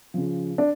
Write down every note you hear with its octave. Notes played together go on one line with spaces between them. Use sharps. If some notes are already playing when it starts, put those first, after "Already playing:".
C#3 F3
D4